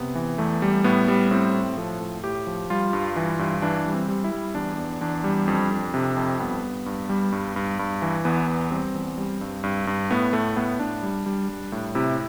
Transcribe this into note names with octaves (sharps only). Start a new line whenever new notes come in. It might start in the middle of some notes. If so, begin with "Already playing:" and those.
Already playing: C3 B3
E3
E2 A3
G3
A2 B3
G3
A2 C4
A2
F3 A4
A2
A2 G4
F3
G3 F4
G2
E3
G2
E3 D4
G3
C4
G3
E4
G3
E2 D4
E2
E2 D4
G3
F2
F2
C3
F2
G2 B3
G2
G2
G3
G2
G2
G2
E3
E2 B3
E2
G3 C4
E2
G3
G2
G2
G2
A2 B3
A2 A3
A2 B3
A2 D4
G3
G3
G3
A2
C3 E4